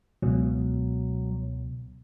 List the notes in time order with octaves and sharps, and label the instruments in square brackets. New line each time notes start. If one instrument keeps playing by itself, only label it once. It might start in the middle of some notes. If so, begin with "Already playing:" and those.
[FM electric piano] C#2 B2 [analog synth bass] F#3